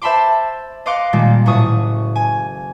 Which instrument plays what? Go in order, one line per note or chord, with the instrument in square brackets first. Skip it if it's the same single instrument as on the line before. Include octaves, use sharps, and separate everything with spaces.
[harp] C5 E5 A5 B5 C6 D6
D#5 F5 C6 D6 F#6 C#7
A#2 D#3 G3 G#3 A#3
F#1 A2 F#4 C#6 D#6
G#5